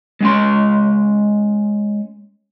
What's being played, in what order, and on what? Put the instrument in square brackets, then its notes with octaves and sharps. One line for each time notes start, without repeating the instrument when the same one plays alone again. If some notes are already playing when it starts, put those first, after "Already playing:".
[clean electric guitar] G#3 C#4 C6